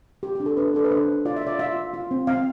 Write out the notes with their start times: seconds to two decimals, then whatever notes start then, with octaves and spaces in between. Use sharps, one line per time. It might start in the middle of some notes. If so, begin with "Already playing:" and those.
0.23 F4 G4
0.35 D4 G4
0.46 A4
0.57 D4 B4
0.74 D4 A4
0.84 B4
0.91 D4 C5
1.09 D4
1.25 F4 D5
1.36 E5
1.42 F4 D5
1.59 F4 E5
1.76 F4
1.94 F4
2.11 C4
2.27 C4 F5